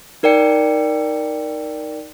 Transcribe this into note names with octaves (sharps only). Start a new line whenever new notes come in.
D#4 A#4 D5 G5 C#7